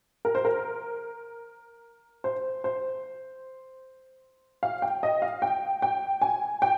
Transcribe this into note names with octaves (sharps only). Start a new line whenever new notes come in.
A#4
C5
A#4
C5
C5
F5
G5
D#5
F5
G5
G5
G#5
G5